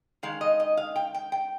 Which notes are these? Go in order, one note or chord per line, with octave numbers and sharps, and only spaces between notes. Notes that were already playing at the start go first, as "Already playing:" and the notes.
D#3 G#3 F5
D#5
D#5
F5
G5
G5
G5